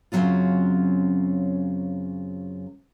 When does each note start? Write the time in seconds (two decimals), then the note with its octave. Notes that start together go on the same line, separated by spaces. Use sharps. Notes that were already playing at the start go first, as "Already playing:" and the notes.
0.12 F#2 C#3 F3 F#3 C4 F4